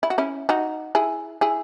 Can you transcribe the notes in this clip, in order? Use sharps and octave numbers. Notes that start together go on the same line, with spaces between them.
E4
F#4
C#4 E4
D#4 F#4
E4 G#4
E4 G#4